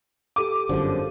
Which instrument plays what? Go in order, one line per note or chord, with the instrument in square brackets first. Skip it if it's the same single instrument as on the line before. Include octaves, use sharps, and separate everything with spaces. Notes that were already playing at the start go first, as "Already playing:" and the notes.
[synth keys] G4 A4 D#7 [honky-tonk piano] D6
[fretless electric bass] G1 F#2 D3 [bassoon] F3